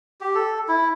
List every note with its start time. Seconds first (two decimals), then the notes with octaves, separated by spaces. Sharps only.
0.21 G4
0.35 A4
0.68 E4